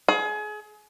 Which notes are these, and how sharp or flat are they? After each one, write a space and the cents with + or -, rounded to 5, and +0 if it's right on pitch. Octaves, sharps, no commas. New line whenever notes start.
G#4 +30